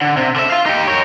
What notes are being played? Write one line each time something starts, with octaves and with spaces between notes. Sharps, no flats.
D3
C3
D3 E5
F4 F5
D#4 G4
A#4 C#5